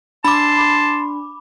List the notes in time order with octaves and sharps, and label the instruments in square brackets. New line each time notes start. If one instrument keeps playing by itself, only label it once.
[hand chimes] D4 [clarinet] A5 [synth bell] B5 D6 [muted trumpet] C6